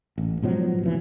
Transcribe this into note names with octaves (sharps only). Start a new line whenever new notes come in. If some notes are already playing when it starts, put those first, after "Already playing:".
A1
G#2 B2 F3 F#3
F1 E3